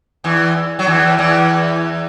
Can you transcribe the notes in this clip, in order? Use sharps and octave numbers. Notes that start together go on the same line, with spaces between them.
E2 E3
F#3
E2 E3
E2 E3